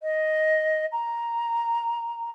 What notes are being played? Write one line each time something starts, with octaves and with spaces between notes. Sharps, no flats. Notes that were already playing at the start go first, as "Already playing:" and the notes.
D#5
A#5